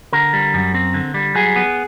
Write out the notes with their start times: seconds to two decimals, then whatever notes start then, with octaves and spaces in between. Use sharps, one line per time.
0.13 D3 A#4
0.33 G3
0.54 F#2
0.74 C4
0.94 D3
1.14 G3
1.35 F#3 G#4
1.56 B3